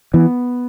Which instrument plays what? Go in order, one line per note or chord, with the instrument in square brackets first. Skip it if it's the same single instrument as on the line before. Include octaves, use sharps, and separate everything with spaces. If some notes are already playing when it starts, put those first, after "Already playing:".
[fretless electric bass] E3 [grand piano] B3